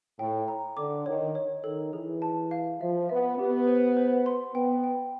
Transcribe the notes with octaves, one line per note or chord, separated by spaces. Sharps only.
A2 G5
A#5
D3 D6
D#3 C#5
C#5
D#3 A4
E3 G#4
A5
F5
F3 E5
B3 E5
B3 G4
C5
C5
C6
B3 G5
G5